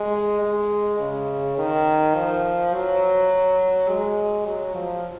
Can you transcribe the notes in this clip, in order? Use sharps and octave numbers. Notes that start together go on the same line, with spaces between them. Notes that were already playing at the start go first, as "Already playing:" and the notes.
Already playing: G#3
G#3
C#3
D#3
F3
F#3
G#3
F#3
F3